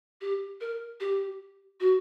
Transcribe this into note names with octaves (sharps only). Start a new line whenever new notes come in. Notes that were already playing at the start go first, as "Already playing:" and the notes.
G4
A#4
G4
F#4